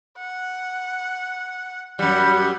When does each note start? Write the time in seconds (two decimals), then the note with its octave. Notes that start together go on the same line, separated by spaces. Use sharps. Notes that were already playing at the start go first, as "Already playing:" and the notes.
0.18 F#5
1.99 F#2 G3 F#5